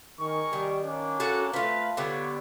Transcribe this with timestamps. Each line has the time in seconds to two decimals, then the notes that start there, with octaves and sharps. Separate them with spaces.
0.20 D#3 G#4 A#4 C#6
0.53 D#3 G3
0.84 A#3 C#4 D4
1.20 F#4 A4 F#5
1.53 A3 C4 F4 B4 F5
1.97 D3 G3 B3 G4 C#5